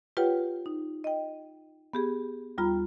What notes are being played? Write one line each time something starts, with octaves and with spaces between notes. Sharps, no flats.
F4 G4 B4 C#5 F#5 G5
D#4
D#5 G5
B3 G4 G#4
D#2 G3 F4 A#5 B5